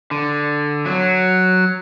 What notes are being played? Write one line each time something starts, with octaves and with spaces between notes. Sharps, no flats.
D3
F#3